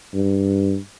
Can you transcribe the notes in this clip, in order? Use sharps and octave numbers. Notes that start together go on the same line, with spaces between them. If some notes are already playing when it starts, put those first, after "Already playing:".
G2